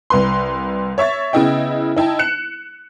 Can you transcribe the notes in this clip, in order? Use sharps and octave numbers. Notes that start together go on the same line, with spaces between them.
C2 B4 C6
C#5 E5 C#6 A6
C#3 B3 E4 D#5 G5
D#4 E4 G5 A5
F#6 C#7 E7